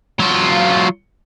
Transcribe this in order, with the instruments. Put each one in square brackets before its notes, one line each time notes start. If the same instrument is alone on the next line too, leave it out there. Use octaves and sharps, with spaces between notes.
[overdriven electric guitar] F#3 F4